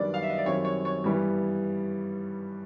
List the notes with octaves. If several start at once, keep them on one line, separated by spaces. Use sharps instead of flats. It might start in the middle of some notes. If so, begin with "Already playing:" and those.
Already playing: F#2 D#3 G3 B3 D4 D5
F5
E5
D#5
D5
F#2 D#3 G3 C4 C#5
C#5
C#5
G2 E3 G3 B3